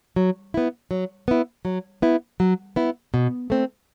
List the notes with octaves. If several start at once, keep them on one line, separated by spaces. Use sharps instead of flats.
F#3
B3 E4
F#3
B3 E4
F#3
B3 E4
F#3
B3 E4
B2
A3 C4